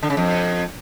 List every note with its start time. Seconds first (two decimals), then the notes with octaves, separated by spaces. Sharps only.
0.03 D3
0.10 C#3
0.17 F2